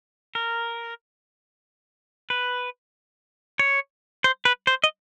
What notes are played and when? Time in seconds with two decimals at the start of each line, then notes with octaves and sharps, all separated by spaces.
0.35 A#4
2.30 B4
3.59 C#5
4.24 C5
4.45 B4
4.67 C5
4.84 D#5